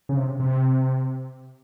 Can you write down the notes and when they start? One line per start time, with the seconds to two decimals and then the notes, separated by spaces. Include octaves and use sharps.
0.09 C#3
0.17 C3
0.40 C3